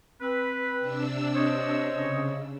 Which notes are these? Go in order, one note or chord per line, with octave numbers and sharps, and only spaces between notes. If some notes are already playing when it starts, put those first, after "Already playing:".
C4 B4
C3 D4 E6
C5 C#5 D#5
C#3